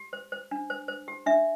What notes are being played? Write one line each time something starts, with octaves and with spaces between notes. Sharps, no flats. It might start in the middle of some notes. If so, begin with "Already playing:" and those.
Already playing: G4
C5
C5
D4
C5
C5
G4
D4 E5